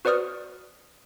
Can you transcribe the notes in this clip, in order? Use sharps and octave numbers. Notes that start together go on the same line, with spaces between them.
F#4 B4 C5 D5 D#6 F6